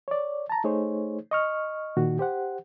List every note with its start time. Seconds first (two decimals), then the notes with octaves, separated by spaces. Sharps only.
0.08 C#5 D5
0.50 A5 A#5
0.64 A3 D#4 G#4 C5 C#5
1.31 D#5 C#6 F6
1.97 A#2 D#3 F#4
2.19 G4 C5 F#5